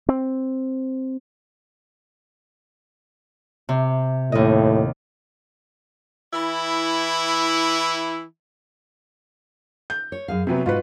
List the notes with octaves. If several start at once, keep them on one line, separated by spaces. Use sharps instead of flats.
C4
C3
D#2 A2 D#5
E3 E4
G6
C#5
F#2 G#4 F5
C3 F#3 B3 E5 G#5
G#2 F4 F#4 B4